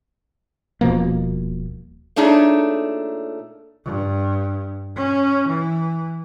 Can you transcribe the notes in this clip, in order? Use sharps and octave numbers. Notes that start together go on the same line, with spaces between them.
D#1 B2 F3 A#3
A#2 A3 D4 D#4 G#4 C#5
G2
C#4
E3